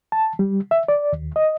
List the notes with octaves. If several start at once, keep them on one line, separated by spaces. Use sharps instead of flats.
A5
G3
E5
D5
D#2
D#5